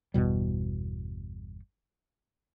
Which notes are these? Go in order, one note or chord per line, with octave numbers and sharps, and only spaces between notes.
G1 E2 B2 G3